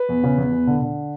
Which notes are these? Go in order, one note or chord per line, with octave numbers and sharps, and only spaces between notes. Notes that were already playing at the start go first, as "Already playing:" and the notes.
Already playing: B4
E2
C#3
E2
E2
D3
D3